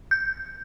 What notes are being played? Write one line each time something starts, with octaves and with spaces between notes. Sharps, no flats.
G6